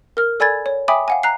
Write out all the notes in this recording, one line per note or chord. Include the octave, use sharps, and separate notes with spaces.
A#4 F6
A4 D5 G#5 B5 G#6 A6
C#5
E5 G5 G#5 B5 D6 D#6
F5 F#5 G#5
A#5 F#6 C7